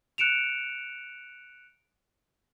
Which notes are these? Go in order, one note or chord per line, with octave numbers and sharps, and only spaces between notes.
F#6 C#7 D7 E7 F7